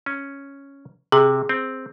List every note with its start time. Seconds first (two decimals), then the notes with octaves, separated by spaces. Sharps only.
0.06 C#4
1.12 C3 G#4
1.49 C4